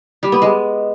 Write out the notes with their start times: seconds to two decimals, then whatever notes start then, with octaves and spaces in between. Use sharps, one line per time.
0.23 G3
0.32 B3
0.42 G#3